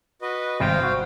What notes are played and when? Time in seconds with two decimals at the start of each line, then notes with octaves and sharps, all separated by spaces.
0.22 F#4 B4 D#5
0.60 G#1 C3 G3 C5 F5 G5
0.84 F#4